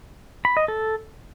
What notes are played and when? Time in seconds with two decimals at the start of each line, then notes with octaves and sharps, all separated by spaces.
0.45 B5
0.57 D#5
0.68 A4